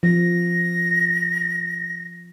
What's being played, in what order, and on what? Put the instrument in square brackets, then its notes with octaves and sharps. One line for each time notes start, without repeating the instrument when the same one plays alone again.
[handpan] F3 [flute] A#6